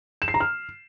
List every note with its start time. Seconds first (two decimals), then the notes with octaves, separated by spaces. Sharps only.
0.22 E7
0.28 C7
0.34 A#5
0.40 F6